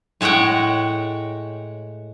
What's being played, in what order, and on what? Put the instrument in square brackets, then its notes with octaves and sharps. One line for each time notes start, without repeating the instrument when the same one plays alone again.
[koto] A2 G#3 C#5 F#5 G5